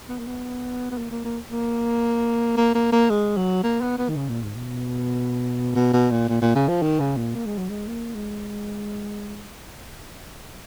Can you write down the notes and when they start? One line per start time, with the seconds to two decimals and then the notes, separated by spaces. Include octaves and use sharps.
0.09 B3
0.19 A#3
0.27 B3
0.91 B3
0.98 A#3
1.11 A#3
1.24 A#3
1.51 A#3
2.57 A#3
2.75 A#3
2.92 A#3
3.10 G#3
3.37 F#3
3.63 A#3
3.81 B3
3.98 B3
4.09 D#3
4.16 C#3
4.29 A#2
4.43 G#2
4.56 B2
5.75 B2
5.93 B2
6.11 A#2
6.29 A#2
6.42 A#2
6.55 C#3
6.68 F3
6.82 D#3
7.00 C#3
7.17 A#2
7.35 A#3
7.45 G#3
7.58 F#3
7.69 G#3
7.87 A#3
8.15 G#3